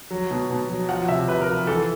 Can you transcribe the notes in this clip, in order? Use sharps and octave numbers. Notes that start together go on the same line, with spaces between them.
F#3
B2
B2
F#3
F3 F#5
C3 E5
C3 B4
A#4
F3
E3 A4